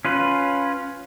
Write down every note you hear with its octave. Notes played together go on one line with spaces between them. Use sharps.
C#4 F4 B4